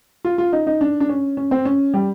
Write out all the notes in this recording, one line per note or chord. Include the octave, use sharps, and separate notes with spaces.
F4
F4
D#4
D#4
D4
D4
C#4
C#4
C4
C#4
G3